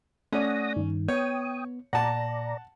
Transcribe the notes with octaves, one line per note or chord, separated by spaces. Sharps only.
A3 C#4 D5 F#5 D#6 A#6
G2 D#3
B3 C#5 G5 D#6
A#2 D5 F#5 A5 A#5